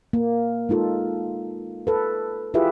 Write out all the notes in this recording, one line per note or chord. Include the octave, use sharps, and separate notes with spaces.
A#3
G#3 D#4 F4 A4
A4 B4
E4 F4 G4 G#4 B4 E5